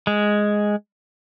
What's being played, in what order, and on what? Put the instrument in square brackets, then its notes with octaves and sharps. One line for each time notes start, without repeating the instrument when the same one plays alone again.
[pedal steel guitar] G#3